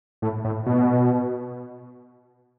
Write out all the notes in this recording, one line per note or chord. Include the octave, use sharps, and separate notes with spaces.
A2
A2
B2